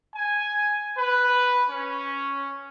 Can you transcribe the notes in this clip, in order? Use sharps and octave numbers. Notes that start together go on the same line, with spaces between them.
G#5
B4
C#4